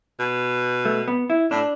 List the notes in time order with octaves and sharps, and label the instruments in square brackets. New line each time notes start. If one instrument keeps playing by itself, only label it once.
[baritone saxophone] B2
[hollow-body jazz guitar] A3
B3
E4
[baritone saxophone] A2 [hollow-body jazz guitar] D4